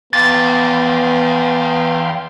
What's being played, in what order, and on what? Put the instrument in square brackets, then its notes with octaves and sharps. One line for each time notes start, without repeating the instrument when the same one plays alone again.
[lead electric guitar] E2 [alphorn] B3 [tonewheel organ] F5 G5 C6 [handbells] A6